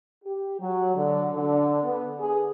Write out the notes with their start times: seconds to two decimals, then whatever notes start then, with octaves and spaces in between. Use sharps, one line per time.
0.24 G4
0.60 F#3
0.95 D3
1.34 D3
1.83 B3
2.20 G#4